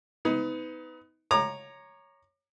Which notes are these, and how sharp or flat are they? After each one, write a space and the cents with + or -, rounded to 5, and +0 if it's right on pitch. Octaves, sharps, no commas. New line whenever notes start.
B3 +25 D#4 +30
C#5 +0 A#5 +0 D6 +40